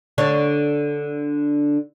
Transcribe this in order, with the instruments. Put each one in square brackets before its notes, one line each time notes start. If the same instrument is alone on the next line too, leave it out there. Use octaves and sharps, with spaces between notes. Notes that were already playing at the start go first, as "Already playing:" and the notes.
[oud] D3 D4 C#5